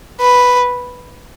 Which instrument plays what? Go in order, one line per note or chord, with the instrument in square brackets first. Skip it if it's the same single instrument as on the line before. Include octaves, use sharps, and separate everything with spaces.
[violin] B4